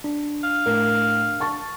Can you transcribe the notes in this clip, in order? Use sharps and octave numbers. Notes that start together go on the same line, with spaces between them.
D4
F5
A2 A#4
A5 C#6 A6